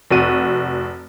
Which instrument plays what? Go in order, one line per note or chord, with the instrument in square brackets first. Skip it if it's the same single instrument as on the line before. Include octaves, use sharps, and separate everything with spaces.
[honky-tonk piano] F1 F#4 D#7